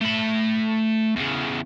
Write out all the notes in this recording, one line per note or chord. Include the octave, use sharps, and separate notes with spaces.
A3 B5
E2 C#3